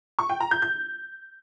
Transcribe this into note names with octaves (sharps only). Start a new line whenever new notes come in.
C#6
G5
A#5
G6
G6